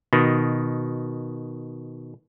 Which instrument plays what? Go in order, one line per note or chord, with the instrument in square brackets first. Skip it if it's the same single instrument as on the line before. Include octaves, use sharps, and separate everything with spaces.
[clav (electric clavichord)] B2 D#3